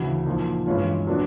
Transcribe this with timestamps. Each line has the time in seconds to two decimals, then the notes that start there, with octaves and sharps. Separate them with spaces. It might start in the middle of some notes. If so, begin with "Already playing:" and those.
Already playing: D2 C#3 E3
0.26 A#2 F3 A#3 D#4
0.66 G2 E3 G#3 C#4 F4
1.06 A#2 F#3 B3 D4